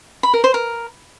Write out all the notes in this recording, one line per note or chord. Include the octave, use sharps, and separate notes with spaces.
B5
A#4
C5
A#4